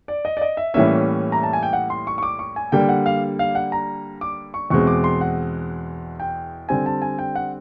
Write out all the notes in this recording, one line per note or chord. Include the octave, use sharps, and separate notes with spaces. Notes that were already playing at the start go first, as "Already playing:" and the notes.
D5
D#5
D5
D#5
E5
A2 E3 G3 A#3 C#4 E5
A#5
A5
G#5
G5
F#5
C6
C#6
C#6
D6
C#6
G#5
D3 G3 A#3 G5
F#5
F5
F5
F#5
A#5
D6
C#6
E2 B2 G#3 C4 C#6
D6
C6
F#5
G5
D3 G3 C4 G#5
A5
G#5
G5
F#5